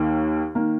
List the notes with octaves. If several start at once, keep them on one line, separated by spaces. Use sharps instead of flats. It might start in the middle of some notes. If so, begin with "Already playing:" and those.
Already playing: D#2 D#3 A#3
D#3 A#3